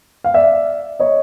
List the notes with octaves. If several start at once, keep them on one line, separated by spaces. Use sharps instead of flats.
F5
D5 E5
C#5 D#5